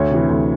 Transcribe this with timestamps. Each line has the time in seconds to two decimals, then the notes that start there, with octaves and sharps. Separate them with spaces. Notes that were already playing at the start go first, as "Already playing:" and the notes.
Already playing: D2 C#5
0.10 C3 E3
0.29 D2